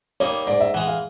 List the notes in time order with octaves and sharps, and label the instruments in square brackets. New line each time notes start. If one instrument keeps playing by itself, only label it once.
[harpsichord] G3 A#3 D#4 [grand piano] C#5
[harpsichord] G#2 [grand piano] D5
[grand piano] E5
[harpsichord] E3 G#3 [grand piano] F#5
[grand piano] F5